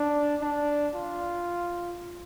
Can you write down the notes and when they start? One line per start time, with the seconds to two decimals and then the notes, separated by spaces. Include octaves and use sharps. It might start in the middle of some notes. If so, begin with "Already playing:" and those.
Already playing: D4
0.42 D4
0.96 F4